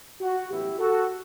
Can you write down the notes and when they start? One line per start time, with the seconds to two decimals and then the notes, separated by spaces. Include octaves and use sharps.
0.21 F#4
0.49 A1 G2 F#3 B3 E4 G4
0.78 F#4 A4